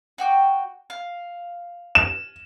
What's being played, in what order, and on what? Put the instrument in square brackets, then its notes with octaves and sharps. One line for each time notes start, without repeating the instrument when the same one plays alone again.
[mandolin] F#4 G5 D6
F5
[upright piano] E7